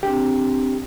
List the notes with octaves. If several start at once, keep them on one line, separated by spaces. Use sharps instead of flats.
C4 D4 G4